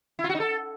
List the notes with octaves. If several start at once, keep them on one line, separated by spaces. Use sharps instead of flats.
E4
F4
F#4
D#4
A4